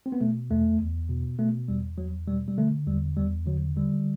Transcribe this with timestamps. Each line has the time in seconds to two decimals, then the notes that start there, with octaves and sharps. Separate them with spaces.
0.06 C4
0.12 B3
0.21 B2 A3
0.50 E2 A3
0.80 E2
1.09 B2
1.39 B2 A3
1.68 E2 G3
1.98 E2 F#3
2.27 B2 G3
2.48 G3
2.58 D3 A3
2.87 E2 G3
3.17 E2 G3
3.46 D3 F#3
3.76 D3 G3